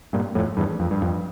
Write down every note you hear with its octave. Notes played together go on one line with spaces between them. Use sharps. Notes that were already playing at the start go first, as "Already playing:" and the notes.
G2 A#2
F2 A2
E2 G2
F2
G2
F2